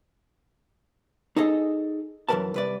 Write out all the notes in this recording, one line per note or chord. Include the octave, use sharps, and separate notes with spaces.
D#4 G#4 A4 D#5
F#2 E3 G3 A#4 B4 A5
C2 B4 D5